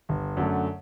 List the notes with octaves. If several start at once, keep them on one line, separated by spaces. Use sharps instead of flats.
G1
F#2 D3 A3